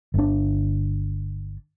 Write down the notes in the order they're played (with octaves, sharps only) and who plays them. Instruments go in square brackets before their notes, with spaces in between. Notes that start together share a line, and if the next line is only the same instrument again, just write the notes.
[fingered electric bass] G1 D4